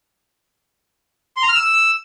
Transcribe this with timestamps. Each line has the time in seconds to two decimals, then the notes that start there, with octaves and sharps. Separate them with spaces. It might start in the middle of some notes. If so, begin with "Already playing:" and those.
1.37 C6
1.43 A#5
1.49 F6
1.55 E6